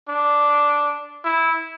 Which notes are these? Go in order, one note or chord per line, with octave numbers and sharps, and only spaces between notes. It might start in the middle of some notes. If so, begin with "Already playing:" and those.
D4
E4